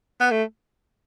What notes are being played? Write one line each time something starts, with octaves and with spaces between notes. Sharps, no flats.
B3
A3